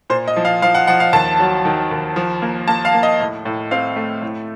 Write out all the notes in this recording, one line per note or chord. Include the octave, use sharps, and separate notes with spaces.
A#2 C5
D#5
F3
F5
F3 F5
F#5
F3 F#5
F5
D#2 A5
F#3
D#3
D#2
F3
A#3
A#3 A5
F5
A#3
D#5
A2
A2
C4 F5
A3
A2